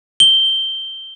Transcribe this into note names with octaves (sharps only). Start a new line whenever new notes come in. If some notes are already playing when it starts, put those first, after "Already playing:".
G7